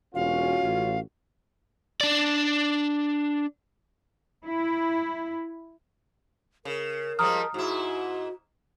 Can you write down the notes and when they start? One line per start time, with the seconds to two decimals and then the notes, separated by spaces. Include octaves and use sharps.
0.15 E1 C#4 F4 F#4 F5
0.63 A1
2.01 D4 D5
4.47 E4
6.65 C#3 A#4
7.19 F3 G3 G#3 A#5 D#6 F6
7.54 G#2 E4 F#4